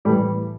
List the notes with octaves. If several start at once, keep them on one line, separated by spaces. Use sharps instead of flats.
A2 E3 G3 A3